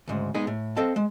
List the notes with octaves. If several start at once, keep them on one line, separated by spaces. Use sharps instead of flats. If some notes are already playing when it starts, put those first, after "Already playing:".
D2 G#2 C#3
G#3 B3 D#4 G#4
A2
C4 A4 D#5 F5 A5
G#3